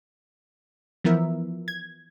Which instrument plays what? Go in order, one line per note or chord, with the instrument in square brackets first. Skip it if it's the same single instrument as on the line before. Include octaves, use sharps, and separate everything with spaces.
[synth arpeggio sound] E3 F3 B3 E4 A#4 E5
G#6